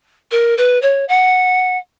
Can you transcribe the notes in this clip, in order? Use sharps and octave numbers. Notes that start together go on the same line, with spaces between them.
A#4
B4
C#5
F#5